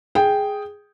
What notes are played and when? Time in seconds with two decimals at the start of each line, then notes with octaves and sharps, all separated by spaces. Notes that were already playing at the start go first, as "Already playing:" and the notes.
0.15 G#4 G5